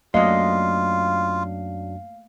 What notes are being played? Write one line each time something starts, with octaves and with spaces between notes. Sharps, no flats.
F#2 F#3 A3 A#3 D4 F4 D#5 F5